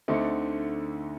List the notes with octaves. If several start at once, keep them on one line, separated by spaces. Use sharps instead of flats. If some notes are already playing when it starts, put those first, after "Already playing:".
D2 D3 A3 C4 D#4